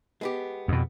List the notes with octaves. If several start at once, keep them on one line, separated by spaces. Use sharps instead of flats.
G#3 B3 G4
F2 B2